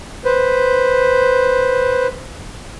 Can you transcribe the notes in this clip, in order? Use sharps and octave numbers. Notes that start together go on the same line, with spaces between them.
B4 C5